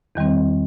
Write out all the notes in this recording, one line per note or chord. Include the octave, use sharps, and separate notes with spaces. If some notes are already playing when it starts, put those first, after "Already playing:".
E2 D#3 G3 C4